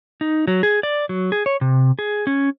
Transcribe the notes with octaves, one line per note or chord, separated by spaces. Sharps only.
D#4
F#3
G#4
D5
F#3
G#4
C#5
C3
G#4
C#4